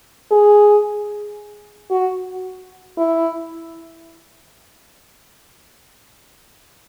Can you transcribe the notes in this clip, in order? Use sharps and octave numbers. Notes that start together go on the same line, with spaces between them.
G#4
F#4
E4